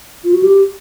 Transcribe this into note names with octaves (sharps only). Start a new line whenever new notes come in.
F4
F#4
G4